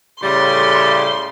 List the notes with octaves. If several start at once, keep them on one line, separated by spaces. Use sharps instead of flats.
A2 C#3 G3 C6